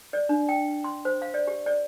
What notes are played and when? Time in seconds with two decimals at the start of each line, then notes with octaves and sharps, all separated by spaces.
0.13 D5
0.29 D4
0.49 G5
0.84 C6
1.05 C5
1.22 F5
1.34 D5
1.47 G4
1.66 D5